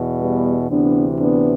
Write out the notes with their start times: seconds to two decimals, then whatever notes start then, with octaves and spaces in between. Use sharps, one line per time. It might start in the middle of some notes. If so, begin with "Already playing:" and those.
Already playing: E2 B2
0.19 G3 B3
0.69 D2 C3 E3 B3 D4
1.20 B3 D4